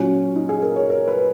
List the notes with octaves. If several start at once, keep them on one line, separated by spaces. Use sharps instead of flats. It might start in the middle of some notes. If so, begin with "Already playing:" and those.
Already playing: A#2 F#3 C#4
D#4
G#4
A#4
C#5
A#4
B4